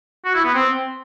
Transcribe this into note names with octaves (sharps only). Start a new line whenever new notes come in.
F#4
E4
B3
C4